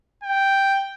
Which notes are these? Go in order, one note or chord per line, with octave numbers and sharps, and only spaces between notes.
G5